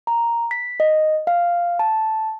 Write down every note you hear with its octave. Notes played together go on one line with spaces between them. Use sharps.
A#5
B6
D#5
F5
A5